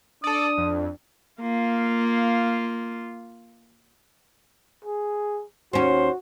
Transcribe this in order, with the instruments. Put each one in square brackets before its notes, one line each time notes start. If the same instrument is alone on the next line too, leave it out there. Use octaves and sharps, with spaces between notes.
[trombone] D4 [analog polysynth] A4 D5 [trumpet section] D#6
[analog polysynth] F2
[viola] A#3 F4
[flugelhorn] G#4
[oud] D#2 C#4 [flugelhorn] F#4 [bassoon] C5